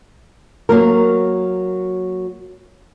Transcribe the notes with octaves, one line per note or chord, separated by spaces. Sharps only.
F#3 A#3 A#4